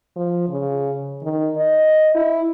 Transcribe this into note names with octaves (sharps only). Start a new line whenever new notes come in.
F3
C#3
D#3
D#5
E4